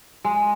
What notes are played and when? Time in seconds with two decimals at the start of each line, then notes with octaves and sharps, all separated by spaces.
0.24 G#3